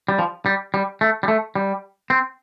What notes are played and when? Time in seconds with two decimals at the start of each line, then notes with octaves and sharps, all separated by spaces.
0.09 G3
0.19 F3
0.46 G3
0.74 G3
1.01 A3
1.23 G3
1.28 A3
1.55 G3
2.10 C4